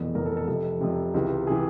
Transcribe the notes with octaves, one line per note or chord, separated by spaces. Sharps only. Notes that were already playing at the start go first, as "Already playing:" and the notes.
Already playing: F1 E2 B2
F1 E2 B2 A#4
A4
A#4
A4
F1 F2 C3 A4
F1 F2 C3
C#2 C3 E3
C3 E3 G#4